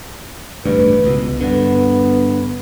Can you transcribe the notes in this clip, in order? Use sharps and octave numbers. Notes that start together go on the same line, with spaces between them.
A1 D2 G2 B4
C#2 B2
G2 D3 B3